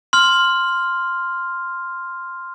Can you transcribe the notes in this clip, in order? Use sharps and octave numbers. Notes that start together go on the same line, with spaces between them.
C6 F6